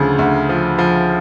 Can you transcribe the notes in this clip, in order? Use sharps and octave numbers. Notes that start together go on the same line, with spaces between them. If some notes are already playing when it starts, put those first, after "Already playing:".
Already playing: D2 C#3 F3
D2
F3
F3